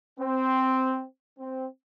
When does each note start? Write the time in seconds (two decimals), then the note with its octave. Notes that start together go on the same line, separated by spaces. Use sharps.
0.19 C4
1.38 C4